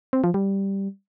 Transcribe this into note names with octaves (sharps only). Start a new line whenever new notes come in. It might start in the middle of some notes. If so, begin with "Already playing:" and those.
C4
F3
G3